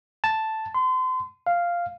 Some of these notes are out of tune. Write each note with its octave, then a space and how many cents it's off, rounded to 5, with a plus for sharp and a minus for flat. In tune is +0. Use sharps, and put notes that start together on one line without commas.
A5 +0
C6 -35
F5 -5